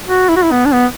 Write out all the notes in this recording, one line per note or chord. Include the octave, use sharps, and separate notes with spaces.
F#4
E4
F#4
E4
B3
D4
B3